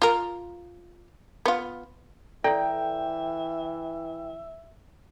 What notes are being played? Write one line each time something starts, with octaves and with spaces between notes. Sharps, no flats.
F4 A#4
B3 F4
E3 E4 A4 D5 E5 G5